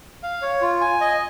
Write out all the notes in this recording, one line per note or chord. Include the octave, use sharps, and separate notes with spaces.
F5
C#5
F4
G#5
D#5